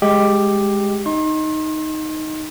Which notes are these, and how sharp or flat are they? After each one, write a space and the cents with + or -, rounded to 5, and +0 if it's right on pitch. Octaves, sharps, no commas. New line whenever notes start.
G#3 -5 G4 +5 D#5 -5
D#4 +0 D#5 +0 C6 +40